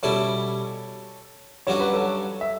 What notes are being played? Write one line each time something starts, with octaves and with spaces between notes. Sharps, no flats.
B2 G3 C#4 E4 A4 C#5
G2 D3 F#3 C#4 F#4 C#5
B4
A4 C#5
E5